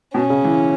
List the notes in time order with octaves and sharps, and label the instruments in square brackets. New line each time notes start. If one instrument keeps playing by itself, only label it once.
[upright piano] B2 [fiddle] C#4
[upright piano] C#3
E3